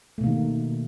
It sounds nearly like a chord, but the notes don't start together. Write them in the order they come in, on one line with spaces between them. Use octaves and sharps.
A3 B2 A#3 D#3